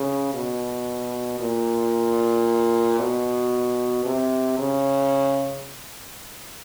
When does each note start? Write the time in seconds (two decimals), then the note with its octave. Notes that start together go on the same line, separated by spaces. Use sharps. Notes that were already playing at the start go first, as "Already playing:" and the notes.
Already playing: C#3
0.34 B2
1.40 A#2
3.00 B2
4.06 C3
4.59 C#3